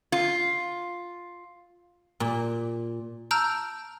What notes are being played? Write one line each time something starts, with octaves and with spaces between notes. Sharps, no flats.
F4
A#2
A5 A#5 E6 F6 G6 D7